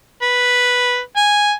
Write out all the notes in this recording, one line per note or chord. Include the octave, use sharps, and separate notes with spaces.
B4
G#5